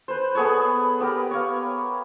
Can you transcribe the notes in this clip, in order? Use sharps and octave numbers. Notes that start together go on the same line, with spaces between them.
B4 C5
B3 G#4 A4 C#5
B3 G4 A#4
C#5 F5